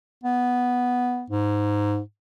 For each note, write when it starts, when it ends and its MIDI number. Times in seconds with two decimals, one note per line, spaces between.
0.24 1.25 59
1.30 2.00 44